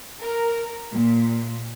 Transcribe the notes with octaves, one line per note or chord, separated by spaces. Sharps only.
A#4
A#2